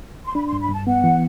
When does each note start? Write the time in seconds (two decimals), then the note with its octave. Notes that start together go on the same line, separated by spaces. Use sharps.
0.25 C6
0.35 D4 B5
0.47 C6
0.53 G2
0.61 B5
0.69 G2 A5
0.87 B3 F#5
1.04 E3